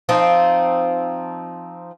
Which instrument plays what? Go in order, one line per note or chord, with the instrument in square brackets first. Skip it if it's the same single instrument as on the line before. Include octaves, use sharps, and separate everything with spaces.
[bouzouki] F3 C4 D#4